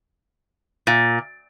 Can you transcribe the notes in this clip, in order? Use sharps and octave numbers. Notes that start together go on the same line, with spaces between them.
A#2